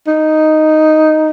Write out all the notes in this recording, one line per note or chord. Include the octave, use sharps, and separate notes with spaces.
D#4